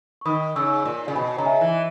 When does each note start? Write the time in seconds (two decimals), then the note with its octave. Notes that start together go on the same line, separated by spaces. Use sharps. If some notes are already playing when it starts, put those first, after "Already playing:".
0.21 C#6
0.25 D#3 B5 D#6
0.55 C#3 C#6 E6
0.85 A#2
1.08 C#3
1.15 B2 G#5 B5
1.38 C#3 A#5
1.46 E5 G#5
1.61 E3